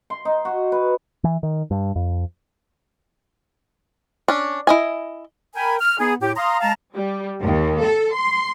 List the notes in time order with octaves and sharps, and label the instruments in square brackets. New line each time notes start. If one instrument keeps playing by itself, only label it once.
[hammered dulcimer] C6
D#4
F#4
B4
[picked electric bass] E3
D#3
G2
F2
[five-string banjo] C#4 D4
E4 D#5 G#5
[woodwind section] A#4 G5 G#5 B5
F6
B3 D#4 G#4
A2 G4
F5 A#5 C6 D#6
G#3 F5 A5 A#5
[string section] G3
D#2
A4
C6